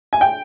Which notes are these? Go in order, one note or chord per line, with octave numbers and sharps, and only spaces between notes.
G#5
G5